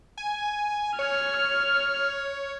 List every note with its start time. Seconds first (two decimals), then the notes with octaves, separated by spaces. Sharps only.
0.17 G#5
0.99 C#5 F6